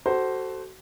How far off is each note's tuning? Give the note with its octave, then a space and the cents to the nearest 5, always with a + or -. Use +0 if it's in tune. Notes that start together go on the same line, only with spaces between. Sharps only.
F#4 +25 A4 +0 C5 +0